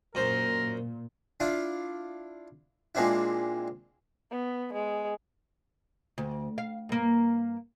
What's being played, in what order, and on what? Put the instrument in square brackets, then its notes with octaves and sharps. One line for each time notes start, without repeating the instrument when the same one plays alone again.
[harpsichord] F#2 C5 [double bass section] A#2 [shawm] A#4
[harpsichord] D4 E4 F4
A#2 G#3 C4 D4 E4
[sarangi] B3
G#3
[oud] D2
F5
G2 A#3